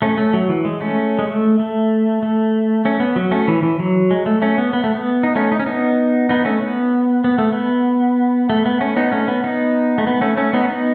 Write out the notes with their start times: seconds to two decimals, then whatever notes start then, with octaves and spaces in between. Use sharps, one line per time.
0.02 A3 C#4
0.18 A3
0.33 F#3
0.49 E3
0.65 G#3
0.81 A3 C#4
1.19 G#3
1.27 A3
1.59 A3
2.23 A3
2.85 A3 C#4
3.00 B3
3.16 F#3
3.31 A3 C#4
3.48 E3
3.63 E3
3.79 F#3
4.11 G#3
4.26 A3
4.42 A3 C#4
4.58 B3
4.73 B3
4.84 A3
4.95 B3
5.23 D#4
5.36 A3 C#4
5.52 D#4
5.60 C#4
5.66 B3 D#4
6.29 B3 D#4
6.45 A3 C#4
6.62 B3
7.24 B3
7.38 A3
7.52 B3
8.50 A3
8.65 B3
8.81 A3 C#4
8.96 B3 D#4
9.12 A3 C#4
9.28 B3
9.44 B3 D#4
9.98 A3
10.07 B3
10.21 A3 C#4
10.37 A3 C#4
10.53 B3 D#4
10.64 C#4
10.68 B3 D#4